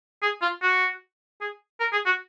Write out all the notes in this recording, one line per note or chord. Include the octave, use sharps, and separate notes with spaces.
G#4
F4
F#4
G#4
A#4
G#4
F#4